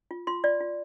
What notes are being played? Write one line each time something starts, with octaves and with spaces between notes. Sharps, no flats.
F4
F4 C6
F4 D5
F4